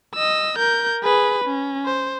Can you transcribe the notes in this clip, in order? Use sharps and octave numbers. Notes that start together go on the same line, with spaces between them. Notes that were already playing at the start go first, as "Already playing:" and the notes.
D#5 E6
A#4 G6
G#4 B4
C#4
C5